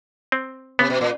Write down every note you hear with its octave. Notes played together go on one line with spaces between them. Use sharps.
C4
C3 B3
B2
A#2